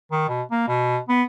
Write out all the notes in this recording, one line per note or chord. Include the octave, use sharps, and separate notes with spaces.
D#3
B2
A#3
B2
B3